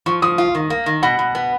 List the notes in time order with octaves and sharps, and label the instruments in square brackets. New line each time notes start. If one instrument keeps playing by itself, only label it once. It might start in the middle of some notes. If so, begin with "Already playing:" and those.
[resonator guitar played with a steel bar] F3 [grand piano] C#6
[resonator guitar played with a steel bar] F3 [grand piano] D#6
[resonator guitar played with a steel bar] F4
D#3
A#3
D#3
[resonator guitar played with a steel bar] B2 [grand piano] F#5
[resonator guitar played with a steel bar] B2
B3